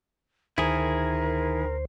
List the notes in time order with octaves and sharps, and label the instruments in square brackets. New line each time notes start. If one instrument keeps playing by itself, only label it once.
[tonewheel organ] D2 C5 [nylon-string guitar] D#3 [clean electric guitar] E4 G#4 [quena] A#4